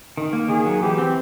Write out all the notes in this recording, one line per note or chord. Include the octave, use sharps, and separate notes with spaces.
D#3
A#3
D#3 G#4
F#3
E3 G4
C4